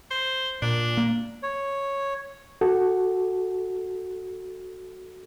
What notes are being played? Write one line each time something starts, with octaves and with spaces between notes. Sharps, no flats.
C5
A#2 D4
A#3
C#5
F#4 A4